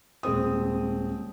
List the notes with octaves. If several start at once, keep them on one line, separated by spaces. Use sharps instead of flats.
D#1 G#3 C4 D#6